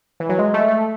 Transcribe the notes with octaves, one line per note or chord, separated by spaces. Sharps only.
E3
F#3
G#3
A3
A3